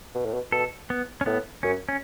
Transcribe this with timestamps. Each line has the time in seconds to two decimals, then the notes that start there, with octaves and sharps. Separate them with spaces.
0.15 B2
0.25 A2
0.33 B2
0.52 B2 A4
0.90 B3
1.21 C#4
1.26 A2 B3
1.63 F#2 C#4
1.89 C#4